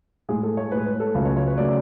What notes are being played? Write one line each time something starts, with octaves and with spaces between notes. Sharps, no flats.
A2 G#3 G#4
A4
C#5
A2 G#3 B4
B4
A4
C#2 C#3 F#3 A3
C#5
C#5
B4
C#3 F#3 A3 D5